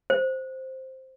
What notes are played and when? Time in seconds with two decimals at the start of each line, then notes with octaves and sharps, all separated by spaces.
0.10 C5